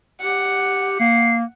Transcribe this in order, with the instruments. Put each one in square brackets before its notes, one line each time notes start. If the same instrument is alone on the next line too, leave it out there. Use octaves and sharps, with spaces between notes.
[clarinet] G4 [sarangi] F#5
[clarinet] A#3 [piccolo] C7